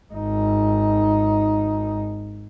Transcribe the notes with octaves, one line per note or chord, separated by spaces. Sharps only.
G#1 D#4